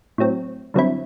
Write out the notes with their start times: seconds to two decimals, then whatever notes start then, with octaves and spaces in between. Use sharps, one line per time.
0.18 A2 F#3 C4
0.74 G2 D3 F#3 C4 E4